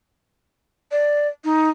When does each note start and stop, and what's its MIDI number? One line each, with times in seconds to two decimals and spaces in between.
0.91 1.28 74
1.44 1.69 63